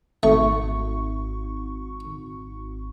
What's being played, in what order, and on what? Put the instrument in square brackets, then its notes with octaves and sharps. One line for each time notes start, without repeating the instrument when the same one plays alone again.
[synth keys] G#1 C#6 [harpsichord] A3